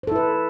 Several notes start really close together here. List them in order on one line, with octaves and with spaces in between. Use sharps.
C5 A4 E4 B4